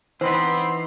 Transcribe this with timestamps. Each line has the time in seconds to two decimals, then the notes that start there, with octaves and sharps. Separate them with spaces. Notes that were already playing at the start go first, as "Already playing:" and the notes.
0.21 E3 B3 C4 D#4 C5 B5 C6